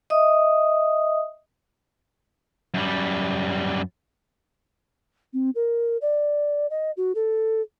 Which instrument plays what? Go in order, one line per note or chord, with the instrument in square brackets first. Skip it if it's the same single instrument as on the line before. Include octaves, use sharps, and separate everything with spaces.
[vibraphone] D#5 E5 D#6
[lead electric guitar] F#2 G3
[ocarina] C4
A#4
D5
D#5
F#4
A4